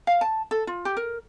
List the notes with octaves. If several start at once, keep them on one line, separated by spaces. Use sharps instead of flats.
F5
A5
A4
F4
G4
A#4